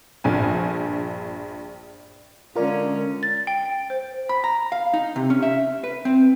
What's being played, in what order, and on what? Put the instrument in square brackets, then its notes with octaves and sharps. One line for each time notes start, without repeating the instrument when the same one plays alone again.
[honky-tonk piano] A#1 G2 G#5
[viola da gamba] D3 G#3 C#4 [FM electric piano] F4 A#4 D5
[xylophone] A6
G5
C5
[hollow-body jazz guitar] B5
A#5
F5
D#4
C3
C#4
E5
B4
C4